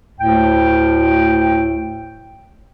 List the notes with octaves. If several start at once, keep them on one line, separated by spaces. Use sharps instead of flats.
D2 A2 G5